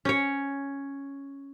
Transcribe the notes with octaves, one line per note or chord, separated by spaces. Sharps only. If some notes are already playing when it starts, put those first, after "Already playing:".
C#4 C#5